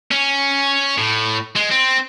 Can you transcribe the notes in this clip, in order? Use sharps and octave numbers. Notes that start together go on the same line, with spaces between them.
C#4
A2
G#3
C4